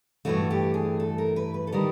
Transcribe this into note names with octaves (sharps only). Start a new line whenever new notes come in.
G2 E3 A3 F#4
G4
G#4
A4
A#4
B4
B4
A4
D#3 G3 A#4